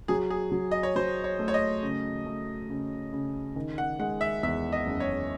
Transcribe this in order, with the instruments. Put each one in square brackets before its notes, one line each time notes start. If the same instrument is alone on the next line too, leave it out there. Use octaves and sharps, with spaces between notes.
[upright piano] F#3 [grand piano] G#4
[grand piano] G#4
[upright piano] F#3
[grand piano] D#5
C#5
[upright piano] F#3 [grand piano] C5
[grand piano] C#5
[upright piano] A3
[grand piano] C#5
D#5
[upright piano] C#3
A3
C#3
C#3
D#3
[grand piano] F#5
[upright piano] G#3 [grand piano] F#5
[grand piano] E5
[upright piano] E2 [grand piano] E5
[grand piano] D#5
[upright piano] F#1
[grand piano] C#5